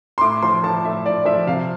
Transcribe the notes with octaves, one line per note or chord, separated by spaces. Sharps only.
C6
A2 D6
F3 C6
F3 A5
A2 E5
A2 D5
F3 E5
C3 F5